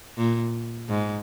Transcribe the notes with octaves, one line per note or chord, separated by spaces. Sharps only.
A#2
G#2